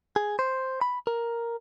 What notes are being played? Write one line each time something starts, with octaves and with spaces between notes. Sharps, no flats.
G#4
C5
B5
A#4